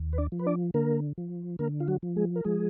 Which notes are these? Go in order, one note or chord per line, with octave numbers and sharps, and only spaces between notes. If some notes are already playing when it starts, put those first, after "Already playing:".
Already playing: D#2
B4
D4 D5
F3
B4
D4 D5
D3 A#3 A#4
F3
D3 A#3 A#4
F4
F#3 F#4
F3
G#3 G#4
A#4
F3 G#3 G#4